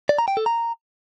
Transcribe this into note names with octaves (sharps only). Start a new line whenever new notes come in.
D5
A#5
G5
A4
A#5